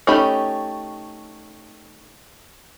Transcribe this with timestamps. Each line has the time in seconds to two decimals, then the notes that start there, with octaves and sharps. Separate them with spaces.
0.07 A3 C#4 D#4 G4 B5